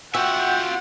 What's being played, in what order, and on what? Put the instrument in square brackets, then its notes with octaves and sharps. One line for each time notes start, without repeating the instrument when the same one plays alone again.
[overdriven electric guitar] F4 E5 [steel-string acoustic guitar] F#4 [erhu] F#5 [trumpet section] G5